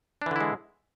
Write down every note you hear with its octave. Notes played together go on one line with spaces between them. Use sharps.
D3 E3 G#3 D4 E4